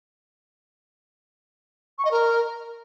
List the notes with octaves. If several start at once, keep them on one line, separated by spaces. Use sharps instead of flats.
C#6
D#5
A#4